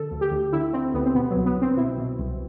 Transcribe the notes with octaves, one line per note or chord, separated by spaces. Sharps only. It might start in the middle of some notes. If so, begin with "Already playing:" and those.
Already playing: D3 A4
D2
G4
D2
D3 E4
D3 C4
D2 B3
C4
B2 B3
F#3
C2
B3
C2 C4
B2 E4
B2
C2